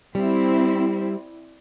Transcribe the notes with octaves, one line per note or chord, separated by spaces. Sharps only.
G3 C4 E4